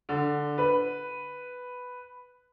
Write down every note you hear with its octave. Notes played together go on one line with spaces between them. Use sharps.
D3
B4